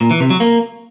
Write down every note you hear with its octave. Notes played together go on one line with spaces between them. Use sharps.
A#2
E3
C3
F#3
A#3